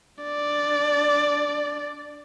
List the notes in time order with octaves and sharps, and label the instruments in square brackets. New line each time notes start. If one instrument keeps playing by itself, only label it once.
[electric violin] D4 D5